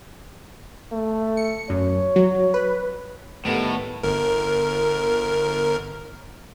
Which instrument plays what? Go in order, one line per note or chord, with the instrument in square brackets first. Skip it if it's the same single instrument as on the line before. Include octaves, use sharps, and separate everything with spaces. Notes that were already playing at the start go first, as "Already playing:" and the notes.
[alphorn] A3
[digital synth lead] C#7
[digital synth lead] F#2 [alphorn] C#5
[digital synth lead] F#3
B4
[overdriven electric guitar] A2 [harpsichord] D3 D#3 G3 [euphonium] B3
[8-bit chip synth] G1 A#4